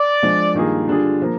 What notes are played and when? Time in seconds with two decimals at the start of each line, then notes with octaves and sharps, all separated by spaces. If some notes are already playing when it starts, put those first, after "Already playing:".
Already playing: D5
0.23 F3 G#3 D4
0.54 G2 D#3 A#3 F4 G#4
0.88 D3 G3 D4 F4 G#4
1.22 F3 A#3